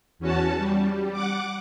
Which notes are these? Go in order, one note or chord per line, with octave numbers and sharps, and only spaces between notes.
E2 C#4 F#4 A5
G3
F#5 D6